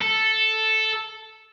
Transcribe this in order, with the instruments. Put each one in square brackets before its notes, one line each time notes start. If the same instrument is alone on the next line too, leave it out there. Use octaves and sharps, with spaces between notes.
[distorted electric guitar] A4